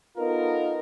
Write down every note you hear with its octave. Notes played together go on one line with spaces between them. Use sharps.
B3 D#4 F4 A4 A#4